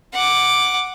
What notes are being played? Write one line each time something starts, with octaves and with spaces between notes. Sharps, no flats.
F#5 D6